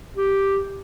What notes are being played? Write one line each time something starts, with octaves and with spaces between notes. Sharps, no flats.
G4